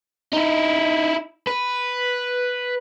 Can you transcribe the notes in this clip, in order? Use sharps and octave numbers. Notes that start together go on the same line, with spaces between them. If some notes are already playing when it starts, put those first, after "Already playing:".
D#4 E4
B4